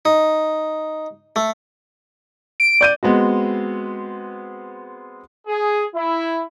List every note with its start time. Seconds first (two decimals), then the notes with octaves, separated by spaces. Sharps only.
0.05 D#4
1.36 A3
2.60 D7
2.81 D5 G6 D#7
3.03 G#3 B3 C4 F#4
5.47 G#4
5.94 E4